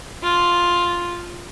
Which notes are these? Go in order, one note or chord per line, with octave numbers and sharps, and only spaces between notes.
F4